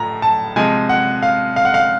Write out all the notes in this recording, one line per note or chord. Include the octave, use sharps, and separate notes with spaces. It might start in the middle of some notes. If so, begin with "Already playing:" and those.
Already playing: A2 F3 A#5
A5
C3 F3 G#3 G#5
F#5
F5
F5
F#5
F5